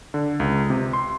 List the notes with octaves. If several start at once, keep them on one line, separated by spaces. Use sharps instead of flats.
D3
C#2
C3
C6